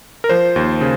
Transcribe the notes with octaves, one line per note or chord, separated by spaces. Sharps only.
A#4
F3 C5
D#2
C#3